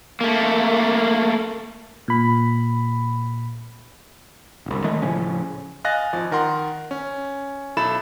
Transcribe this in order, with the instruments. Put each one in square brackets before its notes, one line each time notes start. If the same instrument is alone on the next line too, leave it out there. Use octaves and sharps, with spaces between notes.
[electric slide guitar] A3 A#3
[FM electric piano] A#2 B5
[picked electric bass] D1 C2
D#3 G#3 A3
A2 C#3 F3 C#4
[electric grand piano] D#5 F5 G#5 F#6 A6 A#6
G#1 F3 A6
D#3 A#4 F#5 C6
C#4
B1 E4 A4 B5 A6 E7